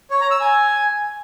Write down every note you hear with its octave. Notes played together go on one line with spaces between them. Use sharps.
C#5
A#5
E6
G#5